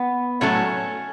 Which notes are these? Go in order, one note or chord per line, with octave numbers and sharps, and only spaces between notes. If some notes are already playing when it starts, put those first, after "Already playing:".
Already playing: B3
A2 F#3 A3 C#4